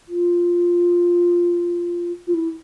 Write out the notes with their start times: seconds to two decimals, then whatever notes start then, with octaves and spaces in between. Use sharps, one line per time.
0.08 F4
2.27 F4
2.34 E4